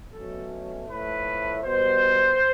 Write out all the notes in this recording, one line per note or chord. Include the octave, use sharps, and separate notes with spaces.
B2 F#3 A3 C#4 A4
A2 F3 A3 B4
B2 G3 B3 C5